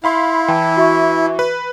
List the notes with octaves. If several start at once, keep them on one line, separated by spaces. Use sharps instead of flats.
E4 F5 B5 C6
E3 G5 A5
F#4 E5 C#6
B4